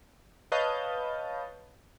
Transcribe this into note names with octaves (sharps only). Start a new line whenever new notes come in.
B4 C#5 D#5 F5 A5 G6